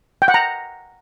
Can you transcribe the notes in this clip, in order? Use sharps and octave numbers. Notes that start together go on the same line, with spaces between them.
G5
F#5
A#5